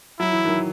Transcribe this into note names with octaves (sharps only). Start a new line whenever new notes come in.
F#3 E4
E3
D#3 F#3